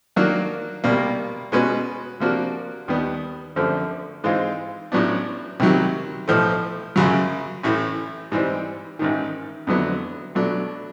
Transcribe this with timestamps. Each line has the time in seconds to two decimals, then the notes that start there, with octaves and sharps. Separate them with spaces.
0.16 D#3 F#3 A#3 D4 F#4
0.84 C2 B2 G3 A#3
1.52 B2 G#3 C#4 F#4 B4
2.20 C3 F3 A#3 D4 F#4
2.88 D#2 D#3 G3 B3
3.56 F#2 D3 F3 A3 C4
4.24 G#2 E3 G#3 C4 F4
4.92 A1 A2 F#3 B3 D4
5.60 C2 C3 D#3 F#3
6.28 B1 A2 F3 A3
6.96 F#2 C#3 F#3
7.63 A1 A2 E3 A3
8.32 G#2 E3 G3 C4
8.99 A1 G#2 D#3
9.67 F2 D3 F#3 B3 E4
10.35 B2 F#3 A3 D4